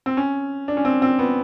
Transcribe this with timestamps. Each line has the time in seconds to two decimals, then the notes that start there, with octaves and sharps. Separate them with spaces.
0.06 C4
0.17 C#4
0.68 D4
0.77 C#4
0.85 C4
1.02 C4
1.19 B3